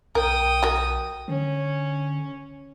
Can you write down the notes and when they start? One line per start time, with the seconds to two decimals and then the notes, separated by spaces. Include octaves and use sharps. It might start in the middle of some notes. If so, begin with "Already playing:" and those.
0.15 B1 A#4 G5 D#6
0.63 F#4 A#4
1.28 D3 C#4